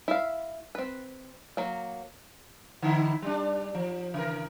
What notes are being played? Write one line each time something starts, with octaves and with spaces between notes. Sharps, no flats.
E4 E5 F5
C4 B4
F#3 A#3
D3 D#4 E4
G3 D4
F3
C#3 E3 A#4